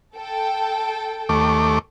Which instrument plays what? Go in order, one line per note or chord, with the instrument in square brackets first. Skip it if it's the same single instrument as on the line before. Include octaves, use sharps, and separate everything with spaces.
[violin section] A4 G5
[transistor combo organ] D#2 A3 D6